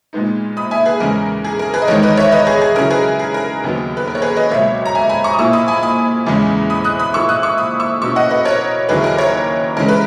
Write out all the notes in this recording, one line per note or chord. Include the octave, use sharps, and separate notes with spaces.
A#2 G#3 B3 D#4
B5 D#6
E5 G#5
G#4 B4
E2 C#3 G#3 C#4 A#4
G#4
A#4
G#4 B4
D#5
E2 D#3 G#3 D#4 A#4 C#5
B4 D#5
C#5 E5
B4 D#5
G#4 B4
G#4
C#3 F#3 C#4 E4 A#4
G#4 B4
G#4
A#4
D#2 C#3 F#3 B3
B4
A#4
C#5
G#4 B4
B4 D#5
C#2 B2 F#3 A#3 C#5 E5
A#5
E5 G#5
G#5 B5
A#5 C#6
D#6
A#2 A#3 E4 C#6 E6
B5 D#6
G#5 B5
B5 D#6
E2 C#3 G#3 C#4 E4
B5 D#6
D#6 F#6
B5 D#6
A#2 A#3 E4 C#6 E6
D#6 F#6
C#6 E6
B5 D#6
C#6 E6
B2 A#3 C#4 E4 C#6 E6
D#5 F#5
B4 D#5
A#4 C#5
D#2 C#3 F#3 A#3 E4 G#4 B4
A#4
A#4 C#5
C#3 E3 G#3 C#4 E4 A#4
B4